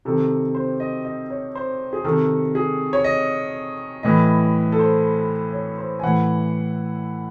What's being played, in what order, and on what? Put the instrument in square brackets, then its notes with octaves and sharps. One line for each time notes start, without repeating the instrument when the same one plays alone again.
[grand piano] C3 D#3 A4
C5
D#5
D#5
C#5
C5
G#4
C3 D#3 A4
G#4
C#5
D#5
A2 E3 D#5
A4
C5
C#5
C5
G#5
A2 E3 F#5